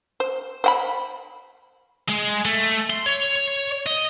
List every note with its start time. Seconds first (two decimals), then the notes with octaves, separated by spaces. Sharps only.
0.20 C5
0.64 C5 F#5 B5
2.09 G#3
2.45 A3
2.90 C6
3.06 C#5
3.86 D#5